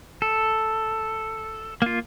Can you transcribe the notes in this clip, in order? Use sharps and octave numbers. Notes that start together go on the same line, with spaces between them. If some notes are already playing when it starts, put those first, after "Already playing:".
A4
A#3 F4